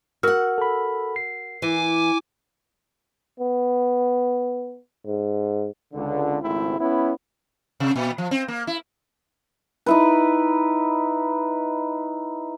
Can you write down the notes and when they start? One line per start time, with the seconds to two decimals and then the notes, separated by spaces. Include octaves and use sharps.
0.23 F#4 A#4 F#5 E6 F6
0.58 A4 B5
1.16 C7
1.62 E3 G#5 D6
3.40 B3
5.06 G#2
5.93 C#2 D3
6.41 G#1 C#2 A3 C4 E4
6.78 B3 C#4 E4
7.80 C3
7.96 A#2
8.18 F3
8.31 C4
8.48 A#3
8.67 E4
9.86 D#4 E4 B4